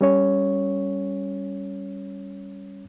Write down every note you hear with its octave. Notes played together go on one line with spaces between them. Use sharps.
G3 C#4 C#5